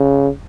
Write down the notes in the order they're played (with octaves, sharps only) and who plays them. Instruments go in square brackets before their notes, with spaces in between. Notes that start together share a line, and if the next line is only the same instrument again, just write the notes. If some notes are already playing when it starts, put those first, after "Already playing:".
Already playing: [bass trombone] C#3